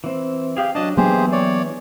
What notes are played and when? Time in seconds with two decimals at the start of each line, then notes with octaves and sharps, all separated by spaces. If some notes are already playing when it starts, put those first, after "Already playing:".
0.04 E3 C4
0.57 G4 G#4 F5 G5
0.75 F#3 D4 D#5 A5
0.97 E3 F#3 A#3 B3 G4 G#4 C5
1.32 C#5 D5